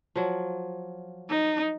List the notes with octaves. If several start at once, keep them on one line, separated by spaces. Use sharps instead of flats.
F3 F#3
D#4